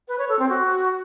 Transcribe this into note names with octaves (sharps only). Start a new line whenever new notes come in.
B4
C#5
A4
C4
F#4